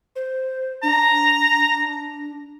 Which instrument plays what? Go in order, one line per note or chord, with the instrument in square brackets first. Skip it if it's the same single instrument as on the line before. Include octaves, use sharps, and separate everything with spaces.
[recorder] C5
[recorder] D4 [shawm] A#5